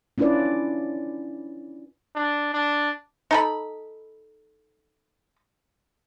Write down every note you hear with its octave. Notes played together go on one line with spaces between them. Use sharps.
C#4 D4 E4 F4 B4 D5
D4
D4
D#4 A4 B5